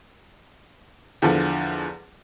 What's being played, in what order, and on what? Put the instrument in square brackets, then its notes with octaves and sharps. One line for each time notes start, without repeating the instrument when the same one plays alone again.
[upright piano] E2 D3 F3